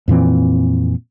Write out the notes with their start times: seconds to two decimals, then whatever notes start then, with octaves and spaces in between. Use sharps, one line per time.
0.08 F2 A#2 E3 C4